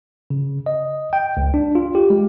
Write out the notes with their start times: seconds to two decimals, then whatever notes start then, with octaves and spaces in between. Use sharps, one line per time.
0.30 C#3
0.66 D#5
1.13 G5
1.37 C#2
1.54 D4
1.75 F4
1.95 G4
2.10 G#3